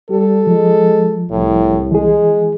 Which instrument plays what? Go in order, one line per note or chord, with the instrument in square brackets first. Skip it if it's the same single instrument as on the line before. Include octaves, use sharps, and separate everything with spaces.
[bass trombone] G3 [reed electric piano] G4 [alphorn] A4
[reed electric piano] F3 [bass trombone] G#3
[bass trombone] C2 [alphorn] A2
[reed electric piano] E3 G#4 [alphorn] G#3